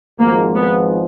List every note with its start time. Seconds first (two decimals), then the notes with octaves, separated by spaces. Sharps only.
0.20 G#1 G#2 F3 A#3
0.55 B3